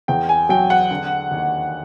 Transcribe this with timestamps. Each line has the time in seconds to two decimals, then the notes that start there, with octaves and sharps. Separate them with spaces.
0.08 E2 G5
0.29 G#5
0.49 F#3 G5
0.70 F#5
0.91 D3
1.31 D#2